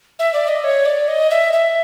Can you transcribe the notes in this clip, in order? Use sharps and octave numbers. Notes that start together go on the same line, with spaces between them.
E5
D5
D#5
C#5
D5
D#5
E5
E5